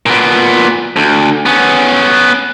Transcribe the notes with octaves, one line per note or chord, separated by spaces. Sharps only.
A#2 B3
D2
B3 C#4